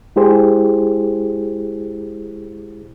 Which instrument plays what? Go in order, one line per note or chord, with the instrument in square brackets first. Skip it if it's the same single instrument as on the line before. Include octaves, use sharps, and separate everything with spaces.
[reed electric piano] G#3 E4 G4 G#4 C5